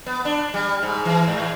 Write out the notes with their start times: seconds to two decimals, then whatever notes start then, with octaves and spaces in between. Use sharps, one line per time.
0.06 B3
0.25 D4
0.54 G3
0.83 G#2
1.05 E3
1.28 G#2